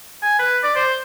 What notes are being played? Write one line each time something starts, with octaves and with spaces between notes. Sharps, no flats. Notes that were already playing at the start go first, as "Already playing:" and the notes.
G#5
B4
D5
C5